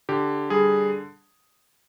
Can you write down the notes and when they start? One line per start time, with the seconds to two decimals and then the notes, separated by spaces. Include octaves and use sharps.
0.09 D3 G4
0.50 G3 G#4